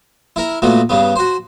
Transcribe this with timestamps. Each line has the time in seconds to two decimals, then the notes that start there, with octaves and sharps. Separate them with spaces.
0.36 E4 A#4
0.62 A#2 A3 B3 F#4
0.89 G2 C#3 B3
1.16 F#4 C5